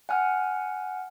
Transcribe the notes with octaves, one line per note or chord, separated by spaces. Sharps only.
F#5 G#5 F6